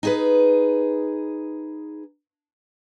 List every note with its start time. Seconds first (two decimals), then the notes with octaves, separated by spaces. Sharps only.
0.03 D#4 G#4 B4